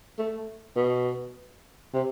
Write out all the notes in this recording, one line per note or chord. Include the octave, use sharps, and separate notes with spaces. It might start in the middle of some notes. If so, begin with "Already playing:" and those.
A3
B2
C3